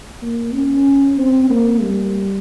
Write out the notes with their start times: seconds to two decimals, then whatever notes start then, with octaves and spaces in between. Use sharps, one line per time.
0.22 A#3
0.54 C#4
1.18 C4
1.50 A#3
1.81 G3